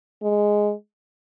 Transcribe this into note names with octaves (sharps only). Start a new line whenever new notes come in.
G#3